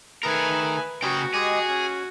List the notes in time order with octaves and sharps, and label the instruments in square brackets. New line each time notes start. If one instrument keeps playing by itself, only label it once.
[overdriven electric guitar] D#3 A#4 [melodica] A3 G#4 [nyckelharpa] B4 G#5
[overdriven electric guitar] C#3 G5 [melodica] C#4 G#4 C#5 [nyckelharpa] F#4
[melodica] G#3 G4 D#5 [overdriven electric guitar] G#4
[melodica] C#4